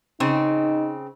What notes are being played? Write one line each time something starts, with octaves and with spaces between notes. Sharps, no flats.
C#3 C4 D#4